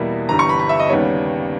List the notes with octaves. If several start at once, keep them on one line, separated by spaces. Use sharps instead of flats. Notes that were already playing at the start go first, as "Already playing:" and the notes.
Already playing: E2 B2 G3 A#3 E4
G1 G2 E3 G3 A#5
C#6
B5
B5
E5
D#5
D#2 C#3 G3 B3 C#5